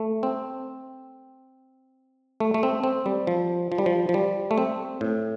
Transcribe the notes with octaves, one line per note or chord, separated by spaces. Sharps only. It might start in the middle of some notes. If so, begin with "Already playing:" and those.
Already playing: A3
C4
A3
A3
C4
C4
G3
F3
F3
G3
F3
F3
G3
A3
C4
A2